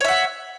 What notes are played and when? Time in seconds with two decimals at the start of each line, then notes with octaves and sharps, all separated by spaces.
0.01 C#5
0.04 E5
0.08 F#5